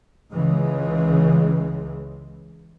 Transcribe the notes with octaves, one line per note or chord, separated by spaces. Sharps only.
C#2 C#3 E3 G#3